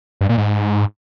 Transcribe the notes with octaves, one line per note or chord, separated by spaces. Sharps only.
G2
A#2
G#2